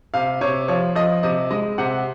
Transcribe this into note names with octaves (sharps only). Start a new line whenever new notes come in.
C3 F5
C3 C#5
F3 C#5
F3 D#5
C3 D#5
G#3 D#5
C3 F#5